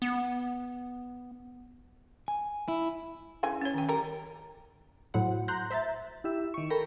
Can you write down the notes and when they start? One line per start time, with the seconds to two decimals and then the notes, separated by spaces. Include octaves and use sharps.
0.02 B3
2.28 G#5
2.68 E4
3.43 C#3 E3 G#5
3.61 C#4 C#5
3.74 D#3 G5
3.89 G3 A#4
5.14 A2 F#3 C5 F#5
5.48 A#5 C6 F#6 G6 A#6
5.71 C5 E5 A#5 G6 A6
6.24 E4 G4 E5
6.54 D#3 C#6
6.70 A4 A#4 G5 A#5 B5